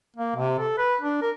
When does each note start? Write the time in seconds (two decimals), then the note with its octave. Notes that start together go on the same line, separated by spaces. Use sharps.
0.16 A#3
0.36 C3
0.59 A4
0.78 B4
1.01 D4
1.21 A#4